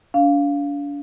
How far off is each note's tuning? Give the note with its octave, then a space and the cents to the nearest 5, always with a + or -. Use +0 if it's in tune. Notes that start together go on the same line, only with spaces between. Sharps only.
D4 -40 F5 +0